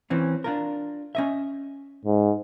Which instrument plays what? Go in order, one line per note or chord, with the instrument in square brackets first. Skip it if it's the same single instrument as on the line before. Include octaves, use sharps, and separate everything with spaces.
[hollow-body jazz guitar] E3 C4 C#4
D4 F4 A#4
C#4 D#5 E5
[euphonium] G#2